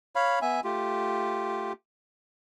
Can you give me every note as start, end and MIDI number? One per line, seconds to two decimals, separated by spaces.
0.16 0.39 73
0.16 0.39 77
0.16 0.39 83
0.42 0.60 59
0.42 0.60 76
0.42 0.60 80
0.64 1.73 57
0.64 1.73 65
0.64 1.73 67